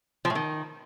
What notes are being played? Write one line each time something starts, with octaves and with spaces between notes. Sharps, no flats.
F3
A2
D#3